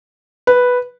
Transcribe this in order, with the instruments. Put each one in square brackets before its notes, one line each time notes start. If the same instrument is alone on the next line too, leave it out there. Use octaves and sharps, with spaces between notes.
[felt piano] B4